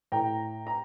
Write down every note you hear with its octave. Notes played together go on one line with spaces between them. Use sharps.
A2 G5 A#5
A#5